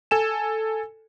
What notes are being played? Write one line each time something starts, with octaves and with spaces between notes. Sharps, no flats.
A4 G#5 E7